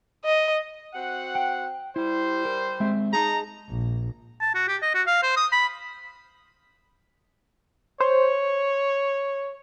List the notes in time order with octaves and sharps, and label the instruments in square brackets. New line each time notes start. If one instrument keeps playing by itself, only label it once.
[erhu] D#5
[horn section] C4 F#4 F#5
[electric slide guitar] G5
[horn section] G3 C5 [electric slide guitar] E4
[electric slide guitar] A#4
G#3 C4 E5
[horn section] D#4 A#5 [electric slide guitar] G#4 A5
[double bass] A#1
[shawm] A5
F#4
G4
D#5
F#4
F5
C5
D#6
B5
[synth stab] C5 [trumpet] C#5